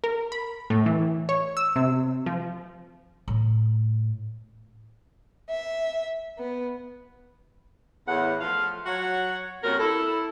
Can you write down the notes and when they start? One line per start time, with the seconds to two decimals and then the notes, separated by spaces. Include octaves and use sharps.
0.04 A#4
0.32 B5
0.70 A2
0.86 E3
1.29 C#5
1.57 E6
1.76 C3
2.26 F3
3.28 A2
5.49 E5
6.38 B3
8.08 E2 A2 F#5
8.41 F3 A3 F5
8.86 F#3 F#4 C#5 F#5
9.64 F2 A#2 G3 C#4 F#4 A#4
9.80 E4 A4